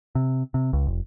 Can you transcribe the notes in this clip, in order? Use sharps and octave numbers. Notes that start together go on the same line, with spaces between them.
C3
C3
C#2
F1